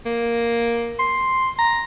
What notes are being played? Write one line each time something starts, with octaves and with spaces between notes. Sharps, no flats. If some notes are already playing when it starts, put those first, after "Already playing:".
A#3
C6
A#5